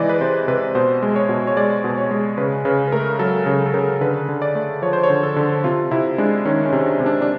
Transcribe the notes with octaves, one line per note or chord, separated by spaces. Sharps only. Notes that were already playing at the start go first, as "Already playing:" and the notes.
Already playing: C3 E3 G#3 D5 D#5
B4
C3 C5
C3 B4
B2 C5
G#3
C#5
B2
C#5
G#3 D5
B2
C#5
G#3
C#3 B4
C#3 B4
B4
A3 A#4
F#3 A4
C#3 A4
A4
C#3 A#4
D3 B4
D3
D5
A3
F3 C#5
C5
C#5
D3
A4
D3
C3 F4
C3 E4
G#3 D4
D#3 C#4
C#4
C3
D4
C3
D4
D4